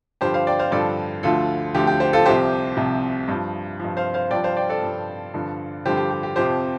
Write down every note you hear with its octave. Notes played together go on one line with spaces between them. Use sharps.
G2 D3 F3 G4 C5
C5 F5
D5 G5
C5 F5
G2 D3 F3 A4 D5
D2 D3 F3 F4 A4
D2 D3 F3 G4
G4
G4 C5
F4 A4
C2 C3 F3 G4 C5
C2 C3 F3
G2 F3
G2 F3
C5 F5
C5 F5
G2 F3 D5 G5
C5 F5
D5 G5
A4 D5
G2 F3
G2 D3 F3
G2 D3 F3 G4 C5
G4
G4
G4
F2 C3 F3 G4 C5